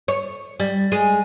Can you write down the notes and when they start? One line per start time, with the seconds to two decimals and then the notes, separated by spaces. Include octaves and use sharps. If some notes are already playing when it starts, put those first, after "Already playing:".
0.08 C#5
0.60 G3
0.92 G#3